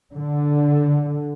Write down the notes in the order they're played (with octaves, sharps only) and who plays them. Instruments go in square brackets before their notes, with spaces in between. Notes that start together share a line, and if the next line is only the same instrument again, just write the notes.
[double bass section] D3